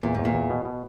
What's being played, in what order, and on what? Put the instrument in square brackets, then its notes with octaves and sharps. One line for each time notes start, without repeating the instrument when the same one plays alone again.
[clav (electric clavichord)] E2 [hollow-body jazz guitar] A#2
[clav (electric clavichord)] E2 [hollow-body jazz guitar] G#2
[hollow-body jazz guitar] A#2
[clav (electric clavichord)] E2
B2
B2